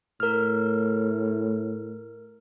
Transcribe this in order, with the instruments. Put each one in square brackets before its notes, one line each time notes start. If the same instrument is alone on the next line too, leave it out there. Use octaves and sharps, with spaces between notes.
[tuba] A2 [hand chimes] A#4 F6